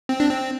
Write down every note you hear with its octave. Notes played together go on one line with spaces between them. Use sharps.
C4
D4
C4